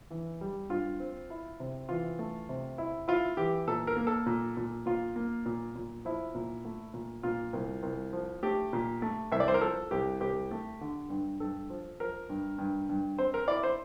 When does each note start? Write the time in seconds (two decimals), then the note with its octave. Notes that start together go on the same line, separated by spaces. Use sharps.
0.11 E3
0.41 G3
0.70 G2 F4
1.00 C4
1.30 E4
1.60 C3
1.89 E3 F4
2.19 A3
2.49 C3
2.78 E4
3.08 E4 F4
3.37 E3 G4
3.67 A#2 A4
3.87 A#4
3.97 A#3
4.07 A4
4.26 A#2
4.57 A#2
4.86 A#2 F4
5.16 A#3
5.46 A#2
5.75 A#2
6.05 F3 E4
6.35 A#2
6.65 A3
6.94 A#2
7.23 A#2 F4
7.53 C2
7.83 C2
8.13 F3
8.43 A3 G4
8.73 A#2
9.02 A3
9.32 C2 E5
9.40 D5
9.48 C5
9.54 A#4
9.61 F3 A4
9.91 C2 G4
10.21 C2 G4
10.51 A3
10.81 D3
11.10 G2
11.40 G2 A4
11.70 F3
12.00 F3 A#4
12.29 G2
12.58 G2
12.89 G2
13.18 C4 C5
13.34 A#4
13.48 E4 D5
13.63 C5